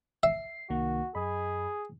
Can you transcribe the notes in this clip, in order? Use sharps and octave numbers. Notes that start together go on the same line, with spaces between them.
E5 C7
C2 D#3 A#3 F#4
F#2 G#4 D#5 B5